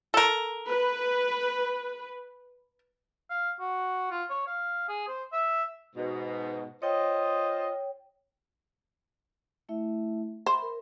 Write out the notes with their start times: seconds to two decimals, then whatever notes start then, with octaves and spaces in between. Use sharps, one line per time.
0.14 A4 A#4
0.68 B4
3.30 F5
3.60 F#4
4.11 F4
4.30 C#5
4.47 F5
4.89 G#4
5.08 C5
5.32 E5
5.96 G#2 B2
6.82 F4 C5 C#5 D#5 G5
9.69 A3 E4 E5
10.46 C5 E5 B5
10.62 A#4